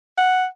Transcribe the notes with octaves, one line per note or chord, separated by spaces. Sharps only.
F#5